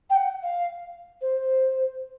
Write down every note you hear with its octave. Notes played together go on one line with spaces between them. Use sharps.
G5
F#5
F5
C5